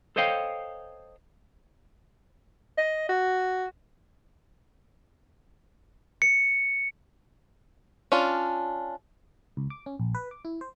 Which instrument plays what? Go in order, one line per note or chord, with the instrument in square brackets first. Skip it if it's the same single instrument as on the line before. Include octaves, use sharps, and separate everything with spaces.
[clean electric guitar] A4 C5 C#5 D#5 F5 G5
[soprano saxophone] D#5
F#4
[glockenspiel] C#7
[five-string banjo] C#4 D4 F4
[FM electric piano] C#2
D6
C#4
A#1
B4
D6
E4
C5